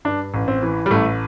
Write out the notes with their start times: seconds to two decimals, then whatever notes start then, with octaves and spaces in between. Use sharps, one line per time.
0.05 G2 D4
0.34 A1
0.48 C4
0.63 E3
0.86 G3
0.91 A1 A3